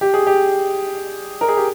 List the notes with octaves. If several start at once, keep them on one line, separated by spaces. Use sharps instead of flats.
G4
G#4
G4
A#4
G#4
G4